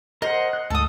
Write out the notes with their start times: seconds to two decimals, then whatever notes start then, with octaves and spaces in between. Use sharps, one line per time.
0.22 A#4 C5 D#5 F#5
0.53 F#6
0.70 D2 G#2 A4 D#6 E6